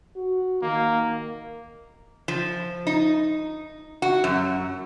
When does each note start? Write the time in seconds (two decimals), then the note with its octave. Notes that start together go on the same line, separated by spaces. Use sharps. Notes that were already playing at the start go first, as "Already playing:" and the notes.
0.16 F#4
0.62 D#3 A#3
2.28 F3
2.87 D#4
4.02 F#4
4.24 F#2